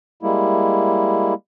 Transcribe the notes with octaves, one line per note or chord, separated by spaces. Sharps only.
G3 G#3 A#3 E4